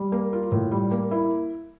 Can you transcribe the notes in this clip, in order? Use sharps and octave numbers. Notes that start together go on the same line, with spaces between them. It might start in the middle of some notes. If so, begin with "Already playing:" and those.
Already playing: G3
A#3
F4
A2
G3
A#3
E4